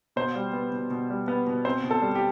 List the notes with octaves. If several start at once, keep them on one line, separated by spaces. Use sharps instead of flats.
B2 C5
G3
B3
B2
B2
G3
B3
B2
C4 C5
B2
A4
G3
G4